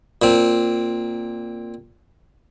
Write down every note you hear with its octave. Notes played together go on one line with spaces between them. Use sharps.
A#2 C4